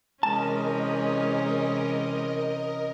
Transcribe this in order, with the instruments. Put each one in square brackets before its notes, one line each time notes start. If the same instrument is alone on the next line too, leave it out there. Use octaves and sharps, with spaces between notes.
[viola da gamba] C3 E3 C#4 [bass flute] G#3 [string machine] A#4 D#5 [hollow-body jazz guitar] A5